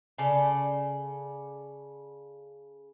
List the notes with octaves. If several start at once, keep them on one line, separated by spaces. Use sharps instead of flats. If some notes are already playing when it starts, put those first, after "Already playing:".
C#3 A4 D5